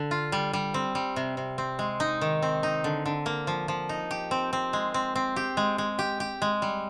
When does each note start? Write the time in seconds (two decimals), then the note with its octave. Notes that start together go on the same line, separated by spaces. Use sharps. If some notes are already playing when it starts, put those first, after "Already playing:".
Already playing: D3
0.11 F4
0.32 G3
0.53 G3
0.74 C4
0.95 G3
1.16 C3
1.37 C3
1.58 C4
1.79 G#3
2.00 D#4
2.21 D#3
2.42 C4
2.63 D#4
2.84 D3
3.06 D3
3.26 A#3
3.47 F3
3.68 F3
3.89 D#4
4.11 G4
4.31 C4
4.53 C4
4.73 G#3
4.94 C4
5.15 C4
5.36 G4
5.57 G#3
5.78 G#3
5.99 G4
6.20 G4
6.42 G#3
6.62 G3